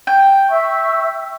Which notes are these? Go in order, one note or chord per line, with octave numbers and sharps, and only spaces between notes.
G5
E5 C#6 E6